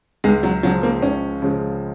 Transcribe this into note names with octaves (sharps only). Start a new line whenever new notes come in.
C#2 G#3
F#3
C#3 F3 F#3 G#3
A#3
C#2 C#4
C#3 F3 G#3